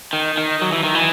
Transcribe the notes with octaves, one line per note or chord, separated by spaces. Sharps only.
D#3
D#3
F#3
E3
D#3
E3